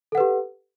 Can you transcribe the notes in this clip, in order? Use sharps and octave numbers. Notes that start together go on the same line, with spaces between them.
G4 A4 B4 F#5